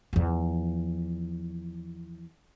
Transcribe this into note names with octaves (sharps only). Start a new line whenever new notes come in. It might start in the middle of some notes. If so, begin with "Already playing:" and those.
E2 F3